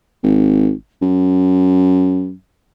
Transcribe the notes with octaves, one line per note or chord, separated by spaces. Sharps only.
G#1
F#2